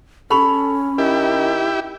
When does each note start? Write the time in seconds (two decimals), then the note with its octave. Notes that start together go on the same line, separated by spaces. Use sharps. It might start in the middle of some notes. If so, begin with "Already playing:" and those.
0.30 C#4 A4 B5 C#6 F7
0.98 D#3 E4 G4